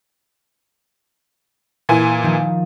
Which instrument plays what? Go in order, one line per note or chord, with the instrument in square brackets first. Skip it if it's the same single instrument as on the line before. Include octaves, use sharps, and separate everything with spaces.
[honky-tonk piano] A#2 E3 G#5
[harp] D#3 F3 D#4